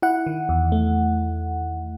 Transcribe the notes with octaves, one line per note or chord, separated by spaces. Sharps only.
E4 F#5
D#3
E2
A3